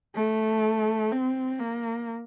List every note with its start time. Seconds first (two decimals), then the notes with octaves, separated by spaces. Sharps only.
0.15 A3
1.12 C4
1.60 A#3